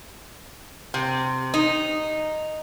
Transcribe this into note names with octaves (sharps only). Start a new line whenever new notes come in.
C3
D#4